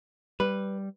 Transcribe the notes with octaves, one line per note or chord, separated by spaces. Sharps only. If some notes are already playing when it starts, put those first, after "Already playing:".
G3 B4